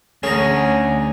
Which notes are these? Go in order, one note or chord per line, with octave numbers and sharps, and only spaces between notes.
D2 C#4 G#4 A#5